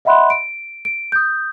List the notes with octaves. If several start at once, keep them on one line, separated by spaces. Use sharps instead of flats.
D#5 E5 F#5 B5 C6 F#6
D7
D7
D#6 G6